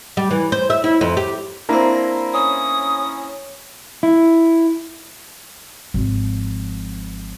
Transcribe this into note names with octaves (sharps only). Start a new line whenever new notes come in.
G3
E3
C5
E5
E4
F2
G4
A#3 C4 D4 E4 A#5
C#4 D#6
E4
G#1 F3